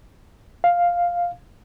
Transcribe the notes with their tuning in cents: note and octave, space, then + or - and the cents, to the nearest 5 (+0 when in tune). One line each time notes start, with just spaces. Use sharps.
F5 +5